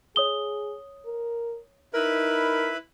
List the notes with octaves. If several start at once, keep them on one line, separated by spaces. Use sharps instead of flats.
G#4 C#5 D#6 G7
A#4
D#4 E4 A#4 B4 B5